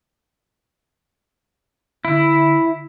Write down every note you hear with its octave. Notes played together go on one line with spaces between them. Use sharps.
D3 E4